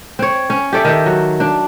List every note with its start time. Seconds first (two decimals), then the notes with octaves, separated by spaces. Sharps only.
0.19 C4 C#5
0.50 C#4
0.73 G4 A4 D5 E5
0.85 D#3 E5
1.06 F#3
1.40 D4